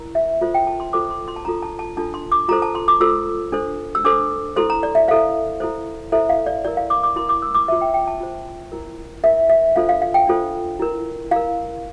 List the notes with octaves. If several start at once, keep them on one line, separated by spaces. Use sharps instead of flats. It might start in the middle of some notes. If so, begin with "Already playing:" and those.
Already playing: E4 A#4
E5
F4 A4 C5
G5
A5
C6
F4 A4 C5 D6
C6
C6
A5
D4 F4 A4 A#5
A5
A5
D4 F4 A4 A5
C6
D6
F4 A4 C5 A#5
A5
C6
D6
F4 A4 C5 E6
D4 A4 C5
E6
D4 A4 C5 D6
E4 A4 C5 C6
A#5
D5
E5
E4 A4 C5 F5
E4 A4 C5
E4 A4 C5 E5
F5
D5
E4 A#4 D5
F5
D6
D6
E4 A#4 C6
D6
E6
D6
F4 C5 E5
G5
G5
A5
F4 C5
E4 A#4
E4 A#4 E5
E5
D4 F4 A4 C5 F5
F5
F5
G5
D4 F4 A4 C5
E4 A#4
E4 A#4 F5